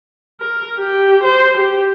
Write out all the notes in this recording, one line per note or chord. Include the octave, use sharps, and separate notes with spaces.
A#4
G4
C5
G4